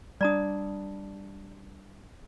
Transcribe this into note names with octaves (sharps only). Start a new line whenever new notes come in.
G3 D4 D5 A#5 D#6